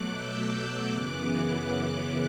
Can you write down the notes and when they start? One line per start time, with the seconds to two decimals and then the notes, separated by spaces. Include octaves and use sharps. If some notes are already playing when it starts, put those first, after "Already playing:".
Already playing: B2 F#3 A3 D6 F#6
0.11 E6 G6
0.89 F#2 C#3 E3 B3 D6 F#6